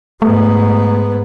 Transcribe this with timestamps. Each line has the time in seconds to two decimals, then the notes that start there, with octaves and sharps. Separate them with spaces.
0.22 G#2 A3 B3